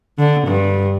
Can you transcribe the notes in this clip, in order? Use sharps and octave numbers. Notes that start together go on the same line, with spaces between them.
D3
G2